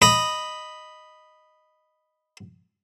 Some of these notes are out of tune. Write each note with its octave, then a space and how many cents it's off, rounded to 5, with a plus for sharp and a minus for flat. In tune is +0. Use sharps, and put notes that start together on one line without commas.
D#5 -5 B5 +0